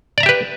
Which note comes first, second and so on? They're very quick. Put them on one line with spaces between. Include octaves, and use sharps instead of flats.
D5 A#5 E5 G4 B4